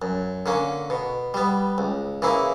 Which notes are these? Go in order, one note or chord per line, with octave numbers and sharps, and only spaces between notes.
F#2
D3 A#3 C#4
B2
G3 B3
C#2
C#3 E3 A#3 E4